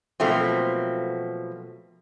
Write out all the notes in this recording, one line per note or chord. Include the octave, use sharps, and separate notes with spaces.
B2 F3 F#3 A3 A#3 C4